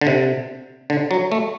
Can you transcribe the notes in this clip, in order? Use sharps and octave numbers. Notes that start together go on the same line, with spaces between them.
D3
C3
D3
F#3
A3